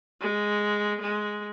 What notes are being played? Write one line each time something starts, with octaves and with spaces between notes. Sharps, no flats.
G#3
G#3